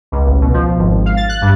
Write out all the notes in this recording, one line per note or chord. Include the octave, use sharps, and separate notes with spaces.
C#2
A1
B2
F3
G#1
F5
A6
F#6
G2